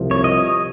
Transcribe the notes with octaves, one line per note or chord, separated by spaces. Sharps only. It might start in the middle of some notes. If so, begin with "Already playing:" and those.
Already playing: C2 C3 F3
C#5
D#5